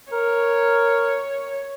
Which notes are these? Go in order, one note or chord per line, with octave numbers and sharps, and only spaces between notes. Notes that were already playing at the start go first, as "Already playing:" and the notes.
A#4 C#5